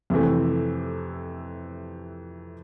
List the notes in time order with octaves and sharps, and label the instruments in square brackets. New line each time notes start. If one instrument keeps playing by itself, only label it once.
[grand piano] F2 C3 E3 A3